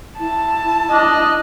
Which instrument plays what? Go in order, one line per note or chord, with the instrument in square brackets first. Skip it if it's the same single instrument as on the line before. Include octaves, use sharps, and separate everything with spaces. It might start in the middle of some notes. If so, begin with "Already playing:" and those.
[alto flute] E4 [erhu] A5
[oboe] D4 [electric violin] D#5